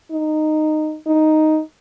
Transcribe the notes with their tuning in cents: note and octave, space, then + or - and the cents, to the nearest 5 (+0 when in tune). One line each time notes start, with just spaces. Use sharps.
D#4 -15
D#4 +0